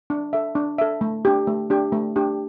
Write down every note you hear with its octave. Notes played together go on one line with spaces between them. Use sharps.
D4
A4 E5
D4
A4 E5
A3
D4 G4
A3
D4 G4
A3
D4 G4